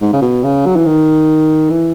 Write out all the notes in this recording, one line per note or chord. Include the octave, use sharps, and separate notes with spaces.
G#2
C#3
B2
C#3
F#3
E3
D#3
E3